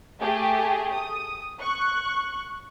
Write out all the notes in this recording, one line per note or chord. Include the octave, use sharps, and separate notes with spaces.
A3 G4 G#4
D#6
C#6 F#6